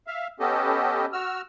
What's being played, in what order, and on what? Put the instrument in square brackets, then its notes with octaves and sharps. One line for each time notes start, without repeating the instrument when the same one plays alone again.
[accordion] E5 F5
B3 C#4 G4 A4 D#5
F#4 E6 F6